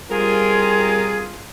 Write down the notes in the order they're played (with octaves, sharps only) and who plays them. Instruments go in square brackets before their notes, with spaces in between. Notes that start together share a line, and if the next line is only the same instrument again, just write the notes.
[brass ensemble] G3 C4 F4 [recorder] G#4 [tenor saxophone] A#4